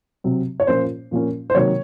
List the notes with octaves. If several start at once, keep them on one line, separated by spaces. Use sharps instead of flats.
C3 F#3 C4
C#5
A#2 F3 A#3 C#4 C5
A#2 F3 A#3 C#4
C5
C3 D#3 F#3 A#3 C#5